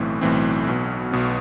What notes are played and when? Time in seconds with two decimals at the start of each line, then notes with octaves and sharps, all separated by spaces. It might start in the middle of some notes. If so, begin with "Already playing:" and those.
Already playing: B1 A2 E3 A3 C4
0.21 B1 A2 E3 A3 C4
0.67 B1 B2 B3
1.12 B1 B2 B3